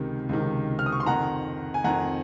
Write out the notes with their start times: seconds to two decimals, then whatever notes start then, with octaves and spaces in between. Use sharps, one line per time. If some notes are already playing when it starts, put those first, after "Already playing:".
Already playing: C#2 C3 D#3
0.29 C#2 C3 D#3
0.79 F6
0.86 D#6
0.92 C#6
1.00 C6
1.06 F2 D#3 F#5 A#5
1.74 G#5
1.84 F2 D#3 F#5 A#5